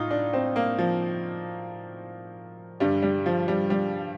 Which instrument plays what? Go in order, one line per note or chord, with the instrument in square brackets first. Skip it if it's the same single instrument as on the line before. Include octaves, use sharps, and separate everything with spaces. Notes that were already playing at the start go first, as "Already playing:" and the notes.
Already playing: [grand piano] A2 D#4 F4
D4
C4
A#3
F3
G2 D3 G3
G3
F3
G3
G3